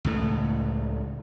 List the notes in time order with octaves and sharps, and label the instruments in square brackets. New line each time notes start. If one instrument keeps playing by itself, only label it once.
[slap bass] C#2 A2 A3